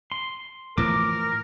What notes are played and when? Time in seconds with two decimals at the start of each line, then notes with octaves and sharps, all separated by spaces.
0.12 C6
0.78 A2 E3 F3 A#4 D6